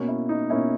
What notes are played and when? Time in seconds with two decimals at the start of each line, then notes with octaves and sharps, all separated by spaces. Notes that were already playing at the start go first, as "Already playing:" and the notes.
Already playing: B2 A#3 C#4
0.08 E4
0.29 D#4
0.50 B2 A#3 C#4 E4